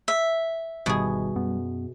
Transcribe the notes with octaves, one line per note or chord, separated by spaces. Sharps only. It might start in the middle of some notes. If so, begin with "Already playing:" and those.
E5
G1 B2 D#3 G3 G#4
F#2 B3